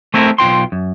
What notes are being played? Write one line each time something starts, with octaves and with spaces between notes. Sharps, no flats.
A3 C4 E4 A#4
B1 F4 G5 C6
F#2